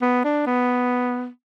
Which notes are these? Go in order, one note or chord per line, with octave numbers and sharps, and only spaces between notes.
B3
D4
B3